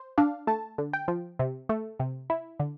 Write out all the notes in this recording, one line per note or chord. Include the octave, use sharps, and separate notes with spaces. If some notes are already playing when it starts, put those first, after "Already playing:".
Already playing: C5
D4 F5
A3 A5
D3
G5
F3
C3
A3
C3
E4
D3